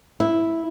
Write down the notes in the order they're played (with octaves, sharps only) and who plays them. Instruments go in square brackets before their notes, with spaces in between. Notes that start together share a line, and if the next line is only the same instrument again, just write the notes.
[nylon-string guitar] E4